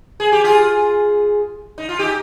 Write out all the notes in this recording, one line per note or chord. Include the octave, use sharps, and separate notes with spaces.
G#4
G4
F4 G#4
D#4
F4
D#4 G4